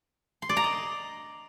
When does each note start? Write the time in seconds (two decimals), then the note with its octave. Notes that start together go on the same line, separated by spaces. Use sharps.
0.42 C6
0.49 D5
0.57 A#5
0.64 D#5